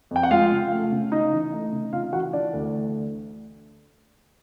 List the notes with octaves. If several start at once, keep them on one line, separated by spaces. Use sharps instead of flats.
F2 G5
F#5
G#3 F4 F5
C#3
A3
C#3
C#3 D#4 D#5
E3
A3
C#3
C#3 F4 F5
E3 F#4 F#5
E3 D4 D5
D2